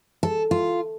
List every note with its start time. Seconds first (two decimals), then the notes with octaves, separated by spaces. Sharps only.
0.23 A4
0.51 F4